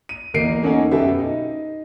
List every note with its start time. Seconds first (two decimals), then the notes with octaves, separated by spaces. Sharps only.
0.09 D#7
0.34 E2 A#3 A#4 D#5 C7 D7
0.63 A#3 C#4 D#4 A4 F#5 G#5
0.91 F#2 B2 B3 G4 A4 E5
1.19 D#4